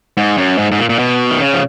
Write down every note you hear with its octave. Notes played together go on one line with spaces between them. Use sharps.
G#2
F#2
G#2
G#2
A#2
A#2
B2
D#3
C#3
F3